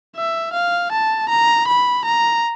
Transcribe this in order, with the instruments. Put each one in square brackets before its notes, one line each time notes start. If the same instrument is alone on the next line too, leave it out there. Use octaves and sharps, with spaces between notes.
[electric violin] E5
F5
A5
A#5
B5
A#5